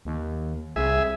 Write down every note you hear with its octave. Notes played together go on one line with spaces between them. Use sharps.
D#2
C2 G#4 E5